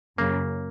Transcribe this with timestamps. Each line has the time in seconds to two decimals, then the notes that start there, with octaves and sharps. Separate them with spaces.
0.18 F#2 C#3 F#3 A#3